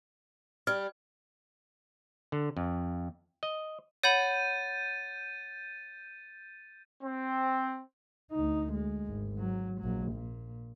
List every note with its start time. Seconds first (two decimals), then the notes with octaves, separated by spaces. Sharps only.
0.67 G3 F6
2.32 D3
2.57 F2
3.43 D#5
4.03 C#5 F#5 B5 G6 A6 D#7
7.03 C4
8.32 D2 D#4
8.74 G#3
9.07 G#1
9.39 F#3
9.80 A#1 F#3
10.13 A#2